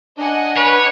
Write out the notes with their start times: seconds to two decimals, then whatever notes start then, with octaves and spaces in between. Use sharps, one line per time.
0.18 D4 D#5 F#5 G#5
0.57 B4 C#5